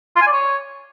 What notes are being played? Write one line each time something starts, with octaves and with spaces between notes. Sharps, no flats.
F4
G#5
D5
C#5